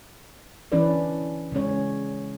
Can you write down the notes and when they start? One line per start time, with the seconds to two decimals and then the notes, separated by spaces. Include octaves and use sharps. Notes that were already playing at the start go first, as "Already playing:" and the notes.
0.72 E3 C#4 D4 E4 B4 D5
1.52 C#3 G#3 C#4 C#5